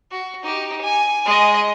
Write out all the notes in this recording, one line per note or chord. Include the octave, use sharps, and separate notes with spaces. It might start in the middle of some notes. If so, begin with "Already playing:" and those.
F#4
D#4 G4
G#5
G#3 D#5